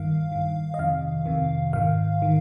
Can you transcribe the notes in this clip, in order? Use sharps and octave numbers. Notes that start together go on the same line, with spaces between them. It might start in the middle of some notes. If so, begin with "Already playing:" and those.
Already playing: G2 D#3 F5
G2 D#3
D#5
F2 C3 D#3 F5
F2 C3 D#3
G#2 D#3 F5
D#3